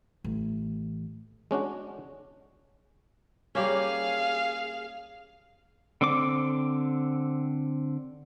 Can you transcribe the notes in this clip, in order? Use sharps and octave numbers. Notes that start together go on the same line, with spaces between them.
A1
G#3 C#4 D4 F#4
G3 A#3 C#4 G#4 F5
D3 C4 D6